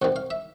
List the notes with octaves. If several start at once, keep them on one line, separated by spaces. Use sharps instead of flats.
C2 C3 D#3 G3 F#5
F5
E5